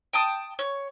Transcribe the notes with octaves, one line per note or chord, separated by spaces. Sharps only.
G5 A5 D#6
C#5